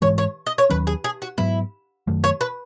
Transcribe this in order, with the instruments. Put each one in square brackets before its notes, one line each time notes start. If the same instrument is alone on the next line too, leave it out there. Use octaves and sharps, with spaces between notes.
[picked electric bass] G#2 E3 G#3 [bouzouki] C#5
[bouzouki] C#5
D#5
C#5
[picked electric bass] D#2 D#3 F#3 C#4 [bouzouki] B4
[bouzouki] G#4
G#4
F#4
[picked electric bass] G#2 F#3 B3 [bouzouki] E4
[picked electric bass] F#2 D#3 F#3 A3
[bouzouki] C#5
B4